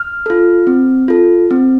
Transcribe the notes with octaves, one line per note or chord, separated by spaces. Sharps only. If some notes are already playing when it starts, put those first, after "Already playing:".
Already playing: F6
F4 A4
C4
F4 A4
C4